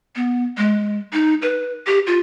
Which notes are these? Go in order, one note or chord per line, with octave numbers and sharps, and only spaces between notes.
B3
G#3
D#4
B4
G4
F4